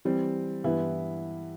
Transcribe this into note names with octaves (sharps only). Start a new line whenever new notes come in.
E3 G3 C4
G2 E3 B3 E4